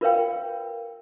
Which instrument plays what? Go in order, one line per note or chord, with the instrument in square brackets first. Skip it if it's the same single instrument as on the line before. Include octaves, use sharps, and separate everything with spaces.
[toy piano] F4 A#4 B4 C#5 F5 G5